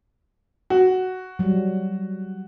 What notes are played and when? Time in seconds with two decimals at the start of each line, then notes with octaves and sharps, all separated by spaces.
0.70 F#4
1.39 F#3 G3